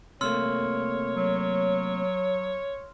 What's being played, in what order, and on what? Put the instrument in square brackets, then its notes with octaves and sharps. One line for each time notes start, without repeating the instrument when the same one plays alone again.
[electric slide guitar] C3 A3 A#3 [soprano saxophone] C#5 [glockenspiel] C6 E6 F6
[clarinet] F#3